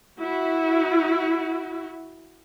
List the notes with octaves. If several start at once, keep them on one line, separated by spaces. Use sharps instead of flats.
E4 F#4